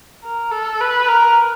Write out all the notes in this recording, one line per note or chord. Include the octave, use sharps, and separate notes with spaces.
A#4
A4
B4
A#4